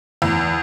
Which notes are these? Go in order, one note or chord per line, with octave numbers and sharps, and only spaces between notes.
E2